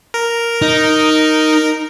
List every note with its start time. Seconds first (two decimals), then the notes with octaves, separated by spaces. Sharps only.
0.14 A#4
0.62 D#4